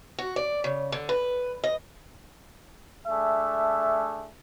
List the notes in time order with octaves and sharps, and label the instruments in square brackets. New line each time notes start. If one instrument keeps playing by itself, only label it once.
[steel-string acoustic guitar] F#4
D5
C#3
D3
B4
D#5
[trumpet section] A3 D4 G#4 E5